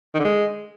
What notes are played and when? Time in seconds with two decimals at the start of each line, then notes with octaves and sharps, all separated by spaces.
0.14 D#3
0.19 D3
0.24 G#3